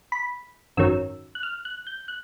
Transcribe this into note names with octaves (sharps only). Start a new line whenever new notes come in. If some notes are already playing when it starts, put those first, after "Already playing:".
B5
G#1 F#2 D#3 F#3 E6
F#6
F6
F#6
G6
F#6